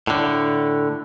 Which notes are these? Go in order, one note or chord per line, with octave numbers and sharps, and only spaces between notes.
A2 D3